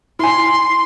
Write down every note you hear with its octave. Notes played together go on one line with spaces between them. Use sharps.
E4 G#5 C6